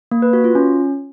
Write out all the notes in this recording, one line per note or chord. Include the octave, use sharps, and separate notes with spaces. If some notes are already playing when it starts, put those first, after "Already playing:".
A#3
B4
F#4
F4
C#4